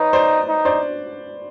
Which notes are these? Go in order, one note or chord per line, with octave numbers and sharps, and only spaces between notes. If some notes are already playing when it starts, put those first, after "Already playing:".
Already playing: D#4 B4 C#5
C5 D5
D#4
C5 D5